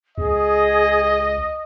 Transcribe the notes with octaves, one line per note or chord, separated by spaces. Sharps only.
C#2 G#4 D#5